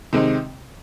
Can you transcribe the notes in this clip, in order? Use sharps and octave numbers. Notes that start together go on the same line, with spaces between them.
C3 D#3 G#3 C4 D#4